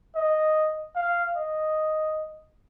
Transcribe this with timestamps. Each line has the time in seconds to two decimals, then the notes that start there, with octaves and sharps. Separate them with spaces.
0.15 D#5
0.96 F5
1.36 D#5